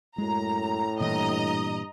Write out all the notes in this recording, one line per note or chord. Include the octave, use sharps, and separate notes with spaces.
F#2 A2 G#3 A#5
G2 A#2 E3 D#5 A#5